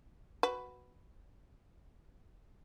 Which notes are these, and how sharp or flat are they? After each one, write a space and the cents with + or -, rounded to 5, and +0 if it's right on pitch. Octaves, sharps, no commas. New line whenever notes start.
F#4 +0 B4 +5